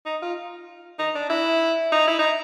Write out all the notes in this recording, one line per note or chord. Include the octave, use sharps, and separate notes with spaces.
D#4
F4
D#4
D4
E4
D#4
E4
D#4